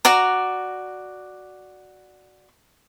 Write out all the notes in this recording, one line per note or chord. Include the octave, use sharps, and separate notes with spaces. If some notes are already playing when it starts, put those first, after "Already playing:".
F#4 D5 A#5